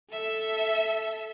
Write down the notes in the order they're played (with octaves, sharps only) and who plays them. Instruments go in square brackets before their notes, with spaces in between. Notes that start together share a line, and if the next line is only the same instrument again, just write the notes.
[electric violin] A4 E5